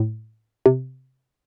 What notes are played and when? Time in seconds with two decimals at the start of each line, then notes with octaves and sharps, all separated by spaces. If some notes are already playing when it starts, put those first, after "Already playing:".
Already playing: A2
0.66 C3